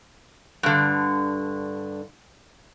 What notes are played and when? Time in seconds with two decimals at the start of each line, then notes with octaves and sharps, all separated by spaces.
0.63 G2 D3